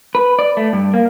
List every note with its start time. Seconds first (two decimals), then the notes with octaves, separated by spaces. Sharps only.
0.15 B4
0.39 D5
0.57 A3
0.73 G2
0.94 A#3